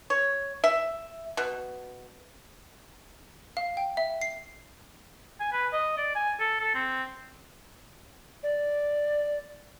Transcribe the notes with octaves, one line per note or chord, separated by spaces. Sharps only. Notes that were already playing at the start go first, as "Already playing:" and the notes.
C#5
E5
B2
F5
G5
E5
C7
G#5
B4
D#5
D5
G#5
A4
A4
C4
D5